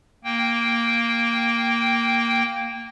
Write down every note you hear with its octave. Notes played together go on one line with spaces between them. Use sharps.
A#3 G5